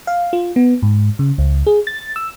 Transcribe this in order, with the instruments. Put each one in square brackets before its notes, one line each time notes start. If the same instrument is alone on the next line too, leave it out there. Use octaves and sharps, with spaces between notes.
[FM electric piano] F5
F4
B3
G#2
C#3
C#2
G#4
A6
E6